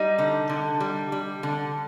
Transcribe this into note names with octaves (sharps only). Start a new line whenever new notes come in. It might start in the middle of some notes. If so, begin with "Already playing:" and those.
Already playing: G3 D#4
D3
D3
G3
G3
D3